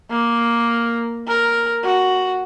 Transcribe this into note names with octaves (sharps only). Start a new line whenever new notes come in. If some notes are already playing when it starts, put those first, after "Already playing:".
A#3
A#4
F#4